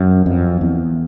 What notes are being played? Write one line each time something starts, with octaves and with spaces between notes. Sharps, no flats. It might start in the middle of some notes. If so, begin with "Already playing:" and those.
Already playing: F#2
F2
E2